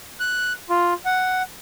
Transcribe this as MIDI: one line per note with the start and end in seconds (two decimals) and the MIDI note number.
0.20 0.53 90
0.70 0.94 65
1.05 1.42 78